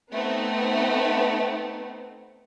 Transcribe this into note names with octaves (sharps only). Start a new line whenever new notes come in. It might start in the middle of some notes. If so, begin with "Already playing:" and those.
A3 B3 C4 D#4